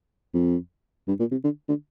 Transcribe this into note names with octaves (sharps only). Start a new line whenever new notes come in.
F2
G2
A#2
C3
D3
D3